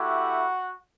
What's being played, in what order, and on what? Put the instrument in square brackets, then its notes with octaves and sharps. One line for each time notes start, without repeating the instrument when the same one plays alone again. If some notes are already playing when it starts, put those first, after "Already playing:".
Already playing: [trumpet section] A3 E4 F#4 G4 F#5